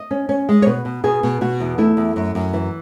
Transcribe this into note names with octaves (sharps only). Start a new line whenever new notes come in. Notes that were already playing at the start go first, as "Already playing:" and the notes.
Already playing: D#5
C#4
C#4
G#3
C#5
B2 B4
B2
B2 G#4
B2
B2 F#4
E2
A3 E4
E2
F#2
F#2
E3